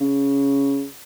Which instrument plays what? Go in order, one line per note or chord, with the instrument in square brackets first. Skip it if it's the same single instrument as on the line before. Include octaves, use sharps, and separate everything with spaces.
[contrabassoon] C#3